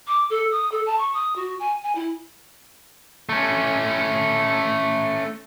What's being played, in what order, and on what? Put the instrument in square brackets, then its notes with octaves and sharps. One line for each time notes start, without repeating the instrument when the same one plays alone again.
[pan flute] D6
A4
D#6
A4
A5
C#6
D#6
F#4
G#5
G#5
E4
[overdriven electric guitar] A3 C#4